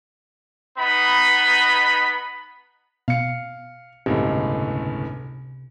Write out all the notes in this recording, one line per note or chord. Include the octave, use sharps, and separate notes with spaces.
B3 D#4 B5
B2 F5 C#7
G1 C#2 A2 C3